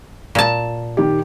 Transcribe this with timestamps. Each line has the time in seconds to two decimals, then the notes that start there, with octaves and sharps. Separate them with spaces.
0.35 A#2 A5
0.97 D#3 G4